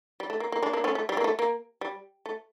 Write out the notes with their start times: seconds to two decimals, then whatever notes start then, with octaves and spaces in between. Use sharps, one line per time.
0.20 G3
0.30 A3
0.40 A#3
0.52 A#3
0.62 A#3 D4
0.73 A#3 D4
0.84 A3 C#4
0.95 A3
1.09 G3
1.17 A#3
1.24 A3
1.39 A#3
1.81 G3
2.26 A3